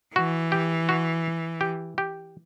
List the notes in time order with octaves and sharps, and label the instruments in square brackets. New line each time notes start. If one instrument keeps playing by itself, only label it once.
[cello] E3 [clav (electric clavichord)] F#4
[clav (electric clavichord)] G4
F#4
G4
G4